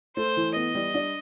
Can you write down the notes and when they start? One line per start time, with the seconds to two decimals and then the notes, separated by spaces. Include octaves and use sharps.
0.17 A3 C5
0.37 E3
0.56 B3 D#5
0.75 G3
0.94 D4